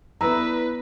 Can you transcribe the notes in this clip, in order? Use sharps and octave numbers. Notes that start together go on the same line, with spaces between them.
B3 E4 A4 B4 D5 A#5 E6